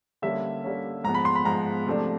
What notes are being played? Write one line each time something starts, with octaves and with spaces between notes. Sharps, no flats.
D3 G3 A#3 C#4 E5
D3 G3 A#3 C#4
G#2 F3 G#3 B3 A#5
B5
C6
B5
G#2 F3 G#3 B3 A#5
C3 F3 A3 D4